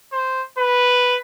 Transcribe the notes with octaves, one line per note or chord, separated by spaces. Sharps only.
C5
B4